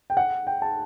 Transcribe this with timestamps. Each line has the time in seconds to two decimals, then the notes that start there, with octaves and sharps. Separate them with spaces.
0.10 G5
0.17 F#5
0.47 G5
0.62 A5